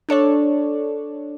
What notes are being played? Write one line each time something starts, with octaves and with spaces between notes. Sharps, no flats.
D4 A4 C#5 D5